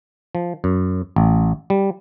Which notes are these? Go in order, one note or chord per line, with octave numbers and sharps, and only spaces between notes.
F3
F#2
A1
G3